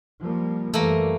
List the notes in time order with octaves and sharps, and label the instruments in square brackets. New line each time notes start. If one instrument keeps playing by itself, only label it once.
[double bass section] F3 G3 A#3
[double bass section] F#2 E3 G3 [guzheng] A3 A#3